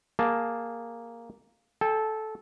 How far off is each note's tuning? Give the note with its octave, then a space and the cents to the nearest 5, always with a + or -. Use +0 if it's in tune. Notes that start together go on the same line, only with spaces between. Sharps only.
A#3 +0 G#4 +0 A5 +0
A4 -15 G5 +40